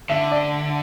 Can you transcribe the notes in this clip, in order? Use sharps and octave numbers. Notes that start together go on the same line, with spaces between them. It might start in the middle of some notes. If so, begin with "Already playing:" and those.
D3 E5
D5